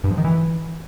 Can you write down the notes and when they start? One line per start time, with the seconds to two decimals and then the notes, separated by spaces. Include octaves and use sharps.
0.04 G2
0.11 F3
0.18 D#3
0.24 E3